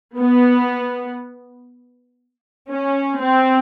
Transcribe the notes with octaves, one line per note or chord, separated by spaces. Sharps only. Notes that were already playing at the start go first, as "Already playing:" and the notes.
B3
C#4
C4